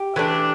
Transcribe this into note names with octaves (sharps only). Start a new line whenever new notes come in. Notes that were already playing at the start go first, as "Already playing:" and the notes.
Already playing: G4
E3 A3 D4